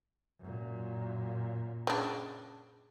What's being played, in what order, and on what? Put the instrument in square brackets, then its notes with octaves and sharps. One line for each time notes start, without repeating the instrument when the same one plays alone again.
[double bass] F#2 A#2
[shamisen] C#3 D4